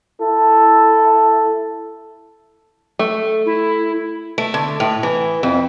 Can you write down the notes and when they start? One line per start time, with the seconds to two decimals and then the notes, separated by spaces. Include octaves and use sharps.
0.21 E4 A4
2.99 A3
3.46 E4
4.38 A3
4.54 D3
4.80 A2
5.03 E3
5.43 F2